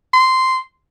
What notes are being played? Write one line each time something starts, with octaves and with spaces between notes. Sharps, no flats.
C6